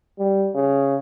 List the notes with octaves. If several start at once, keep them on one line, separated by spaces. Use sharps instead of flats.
G3
C#3